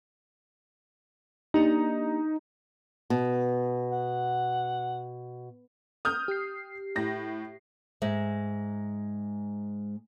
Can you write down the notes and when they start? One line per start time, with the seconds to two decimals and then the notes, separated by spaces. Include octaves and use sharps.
1.54 A#3 D4 D#4 G4
3.10 B2
3.92 F#5
6.05 D#6 F6 G6
6.28 G4 C7
6.96 A2 A#6
8.02 G#2 G#3 E5